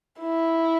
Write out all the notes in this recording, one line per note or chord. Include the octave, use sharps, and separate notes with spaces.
E4